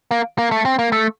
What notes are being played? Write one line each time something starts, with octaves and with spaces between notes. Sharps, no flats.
A#3
A#3
A3
C4
A#3
A3